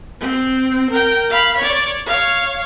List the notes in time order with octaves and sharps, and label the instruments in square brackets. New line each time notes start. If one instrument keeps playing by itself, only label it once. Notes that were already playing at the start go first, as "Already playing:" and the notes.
[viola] C4
A#4 G5
F5 B5
C#5 D5
C#5 F5